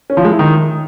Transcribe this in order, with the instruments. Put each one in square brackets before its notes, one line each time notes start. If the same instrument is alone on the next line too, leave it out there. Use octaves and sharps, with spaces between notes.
[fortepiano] C#4
F3
G#3
E4
D#3